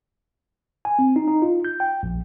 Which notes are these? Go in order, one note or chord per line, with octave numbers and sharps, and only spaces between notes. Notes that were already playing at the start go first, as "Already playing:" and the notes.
G#5
C4
D#4
D#4
F4
G6
G5
A#1